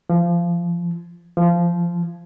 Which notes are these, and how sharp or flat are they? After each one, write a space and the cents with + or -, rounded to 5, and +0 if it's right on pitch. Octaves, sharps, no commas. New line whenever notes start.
F3 -20
F3 -15